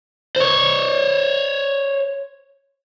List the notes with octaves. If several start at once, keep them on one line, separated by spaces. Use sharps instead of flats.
C5 C#5